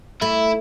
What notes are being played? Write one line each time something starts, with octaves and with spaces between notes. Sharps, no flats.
A3 E4